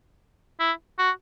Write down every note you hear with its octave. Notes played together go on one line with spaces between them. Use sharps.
E4
F#4